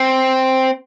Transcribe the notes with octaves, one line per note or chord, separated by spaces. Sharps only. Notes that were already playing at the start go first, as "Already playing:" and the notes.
Already playing: C4